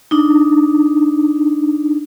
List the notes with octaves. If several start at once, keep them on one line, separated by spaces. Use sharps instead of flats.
D4 D#4